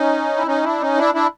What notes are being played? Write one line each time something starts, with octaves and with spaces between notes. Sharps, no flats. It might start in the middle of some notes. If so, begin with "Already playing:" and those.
Already playing: C#4 D#4
E4
C#4 D#4
D4 E4
C#4 D#4
D4 E4
D4 E4